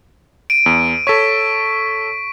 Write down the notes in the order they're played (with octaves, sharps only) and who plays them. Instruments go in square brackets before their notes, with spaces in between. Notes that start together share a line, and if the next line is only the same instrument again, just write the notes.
[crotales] D7 D#7
[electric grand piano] E2
[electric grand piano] A4 C#5 [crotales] C#6 B6 D#7